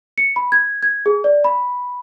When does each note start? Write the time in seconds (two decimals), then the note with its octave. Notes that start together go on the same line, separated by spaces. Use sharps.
0.18 C#7
0.36 B5
0.52 G#6
0.83 G#6
1.06 G#4
1.24 D5
1.44 B5